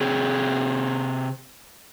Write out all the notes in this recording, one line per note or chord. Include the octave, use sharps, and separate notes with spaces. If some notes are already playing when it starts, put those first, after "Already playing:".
C3 C4 G#4